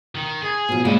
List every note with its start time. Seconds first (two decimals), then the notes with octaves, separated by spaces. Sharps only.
0.15 D#3
0.42 G#4
0.69 B2 F3
0.85 F#2 A#2 C#3 G#3 E4